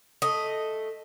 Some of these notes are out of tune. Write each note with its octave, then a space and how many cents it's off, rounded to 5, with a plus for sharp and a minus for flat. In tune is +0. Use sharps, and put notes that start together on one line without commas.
A3 +0 D#5 +0